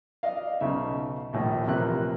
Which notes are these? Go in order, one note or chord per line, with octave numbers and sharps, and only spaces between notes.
D5 D#5 F5
B1 C#3 D#4 E5
A#1 D#2 A2
A#1 C3 E3 A#3 F#6